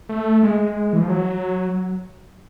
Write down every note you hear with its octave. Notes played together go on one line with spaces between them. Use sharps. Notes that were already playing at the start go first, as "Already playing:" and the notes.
A3
G#3
E3
F3
F#3